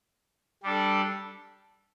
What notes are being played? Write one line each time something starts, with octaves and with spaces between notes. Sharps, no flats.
G3 D4 A4